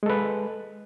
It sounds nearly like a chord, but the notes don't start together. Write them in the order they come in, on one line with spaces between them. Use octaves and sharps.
G#3 A4 B4